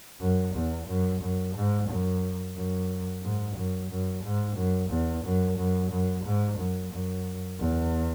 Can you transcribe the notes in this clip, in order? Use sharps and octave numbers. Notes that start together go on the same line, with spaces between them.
F#2
E2
F#2
F#2
G#2
F#2
F#2
G#2
F#2
F#2
G#2
F#2
E2
F#2
F#2
F#2
G#2
F#2
F#2
E2